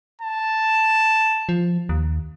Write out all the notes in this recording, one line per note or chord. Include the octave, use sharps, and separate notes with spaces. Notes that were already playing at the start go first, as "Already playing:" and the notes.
A5
F3
D#2